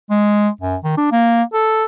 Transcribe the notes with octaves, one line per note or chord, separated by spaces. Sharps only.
G#3
F#2
D#3
D4
A#3
A4